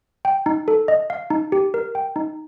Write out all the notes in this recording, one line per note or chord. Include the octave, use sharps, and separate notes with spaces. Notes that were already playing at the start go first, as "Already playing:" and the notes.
G5
D#4
A4
D#5
F5
D#4
G4
A#4
G5
D#4